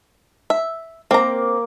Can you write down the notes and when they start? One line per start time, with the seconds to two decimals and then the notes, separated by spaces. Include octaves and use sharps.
0.50 E5
1.11 A#3 C4 A#5